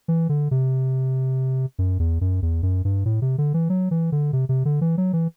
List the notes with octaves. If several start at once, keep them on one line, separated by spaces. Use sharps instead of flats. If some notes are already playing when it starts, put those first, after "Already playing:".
E3
D3
C3
F#2
E2
F#2
E2
F#2
G2
A2
C3
D3
E3
F#3
E3
D3
C3
C3
D3
E3
F#3
E3